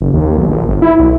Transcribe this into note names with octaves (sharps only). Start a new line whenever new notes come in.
F#1
D#2
B1
A#1
G1
E4
B1